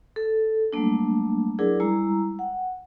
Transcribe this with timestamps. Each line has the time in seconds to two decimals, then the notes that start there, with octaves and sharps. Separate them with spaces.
0.16 A4
0.73 F#3 G3 A3 A#3 D4
1.59 F#3 D4 E4 G#4 A#4 D5
1.80 G3 G#3 E4 A#5
2.39 F#5 G5